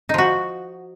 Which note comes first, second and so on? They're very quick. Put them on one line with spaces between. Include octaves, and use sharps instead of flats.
D#4 F3 F#4